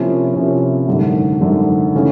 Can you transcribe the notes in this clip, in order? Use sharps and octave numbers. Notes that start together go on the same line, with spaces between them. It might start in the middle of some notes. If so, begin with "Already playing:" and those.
Already playing: C3 F3 A#3 C#4 E4
C3 F3 A#3 C#4 E4
G#1 F#2 D3
G#1 F#2 D3
C#3 E3 A3 C#4